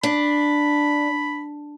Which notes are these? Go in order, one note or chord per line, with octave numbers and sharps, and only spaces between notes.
D4 B5